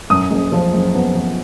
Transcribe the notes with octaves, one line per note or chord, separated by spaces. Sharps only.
F#2 D#6
F#1
F3
F#1
B3
F3